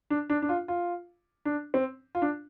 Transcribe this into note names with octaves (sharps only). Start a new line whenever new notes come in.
D4
D4
D4
F4
F4
D4
C4
F4
D4